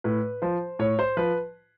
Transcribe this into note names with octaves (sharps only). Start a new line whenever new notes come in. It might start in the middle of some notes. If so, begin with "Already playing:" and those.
A2 B4
F3 C5
A2 C#5
C5
F3 B4